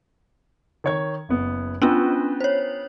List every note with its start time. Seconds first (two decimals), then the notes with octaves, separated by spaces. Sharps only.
0.84 D#3 C#5 G#6
1.29 F#1 B3
1.82 B3 C#4 D4 F4 E6
2.40 C5 C#5